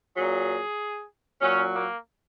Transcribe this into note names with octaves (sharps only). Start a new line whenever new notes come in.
A#2 F#3 G#4
A#2 F#3 C#4
A#3